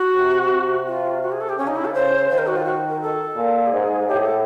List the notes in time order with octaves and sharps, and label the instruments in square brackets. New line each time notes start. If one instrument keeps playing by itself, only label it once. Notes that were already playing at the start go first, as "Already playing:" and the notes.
Already playing: [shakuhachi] F#4
[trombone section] C3
C3
[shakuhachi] F4
F#4
G#4
A4
G4
[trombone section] C#3 [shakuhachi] C#4
[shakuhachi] D#4
E4
A4
[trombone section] C#3 [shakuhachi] C5
[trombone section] D#3 [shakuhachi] C5
[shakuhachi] A#4
F#4
F4
F#4
A#4
A4
[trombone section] A#2
[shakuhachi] G4
[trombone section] G#2 [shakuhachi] G#4
[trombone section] A2 [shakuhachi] G4
[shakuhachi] G#4
A4